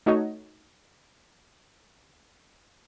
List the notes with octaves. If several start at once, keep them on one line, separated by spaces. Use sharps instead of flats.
A3 D#4 F#4 C#5 D#5